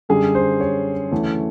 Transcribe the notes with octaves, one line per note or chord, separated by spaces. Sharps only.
F#2 D3 G3 G#4
C5
C#5
D2 C#3 E3 A3